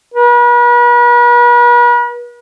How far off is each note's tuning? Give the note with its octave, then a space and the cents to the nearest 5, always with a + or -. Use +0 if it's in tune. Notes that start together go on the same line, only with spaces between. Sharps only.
B4 -40